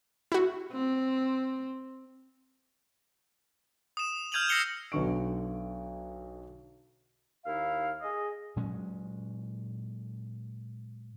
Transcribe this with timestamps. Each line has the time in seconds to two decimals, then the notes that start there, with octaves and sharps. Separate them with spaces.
0.32 E4 F#4
0.72 C4
3.97 D#6 E7
4.32 F6 G6 G#6 D#7 F7 F#7
4.49 E6 A#6 C7 C#7 G7
4.92 B1 B2 D3 C#6 D7
7.45 D#2 D#4 E4 F5
8.01 G#4 D#5
8.56 A#2 F#3 G#3 C#4